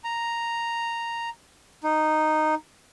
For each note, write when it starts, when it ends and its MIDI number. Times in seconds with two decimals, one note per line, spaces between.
0.04 1.29 82
1.84 2.55 63